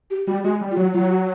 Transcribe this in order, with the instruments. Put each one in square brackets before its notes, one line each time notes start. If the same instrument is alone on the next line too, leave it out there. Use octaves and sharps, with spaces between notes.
[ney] G4
[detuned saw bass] G3 [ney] F#4
[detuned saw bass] G#3 [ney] F#4
[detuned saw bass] G3
[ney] F4
[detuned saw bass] F#3 [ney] F#4
[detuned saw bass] F#3 [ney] F4
[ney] F#4